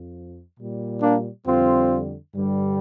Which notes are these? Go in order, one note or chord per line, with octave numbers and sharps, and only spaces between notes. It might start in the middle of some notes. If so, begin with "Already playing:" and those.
Already playing: F2 F3
A#2 G3
A#3 D4
F2 D3 G3 C4 F4
G2 D3 G3